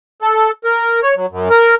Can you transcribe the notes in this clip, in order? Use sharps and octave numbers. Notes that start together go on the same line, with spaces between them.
A4
A#4
C#5
F#3
F#2
A#4